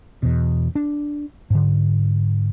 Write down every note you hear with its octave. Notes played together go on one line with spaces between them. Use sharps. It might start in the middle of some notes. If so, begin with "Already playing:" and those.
E2 B2
D4
G#2 D3